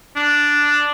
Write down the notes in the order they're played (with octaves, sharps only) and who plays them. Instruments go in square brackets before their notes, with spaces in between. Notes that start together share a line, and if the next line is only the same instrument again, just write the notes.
[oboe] D4